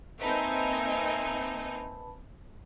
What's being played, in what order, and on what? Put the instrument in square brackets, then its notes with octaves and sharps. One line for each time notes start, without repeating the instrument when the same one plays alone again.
[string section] A#3 C4 D#4 [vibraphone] B4 A5 B5 [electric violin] E5 G#5